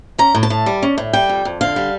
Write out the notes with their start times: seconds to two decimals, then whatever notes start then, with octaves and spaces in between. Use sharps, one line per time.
0.18 C#4 A#5
0.35 A2
0.43 A5
0.50 A2
0.66 G3
0.83 C#4
0.98 A2
1.13 G3 G5
1.29 F2
1.45 F2
1.61 D3 F5
1.76 G3